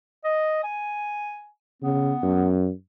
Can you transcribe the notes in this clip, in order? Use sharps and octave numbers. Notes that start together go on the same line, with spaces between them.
D#5
G#5
C#3 B3
F#2